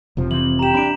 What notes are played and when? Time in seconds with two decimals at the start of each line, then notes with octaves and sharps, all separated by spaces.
0.17 F1 C3 F3
0.31 E3 C4 F#7
0.59 G4 A#5 E7
0.74 C#4 D4 B5 D7